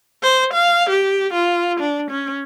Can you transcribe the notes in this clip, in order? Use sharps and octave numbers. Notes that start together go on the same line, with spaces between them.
C5
F5
G4
F4
D4
C#4